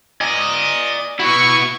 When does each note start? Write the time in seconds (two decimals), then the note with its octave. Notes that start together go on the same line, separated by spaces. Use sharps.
0.21 D5 D#5 G#5
1.19 B3 E4 F#4 C#6